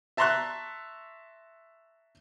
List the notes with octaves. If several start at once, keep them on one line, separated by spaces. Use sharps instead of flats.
E5 A5 A#5 C6 C#6 F#6